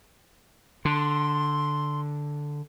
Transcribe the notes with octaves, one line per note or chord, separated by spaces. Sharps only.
D3 C6